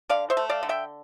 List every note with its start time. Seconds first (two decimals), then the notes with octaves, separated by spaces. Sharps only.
0.10 D3 D5 F5
0.30 C5 E5
0.37 A3
0.49 D5 F5
0.63 D3
0.69 E5 G5